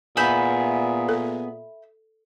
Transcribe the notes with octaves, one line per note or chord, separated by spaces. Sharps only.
A#2 B3 G#4 E5 B5 G6
A4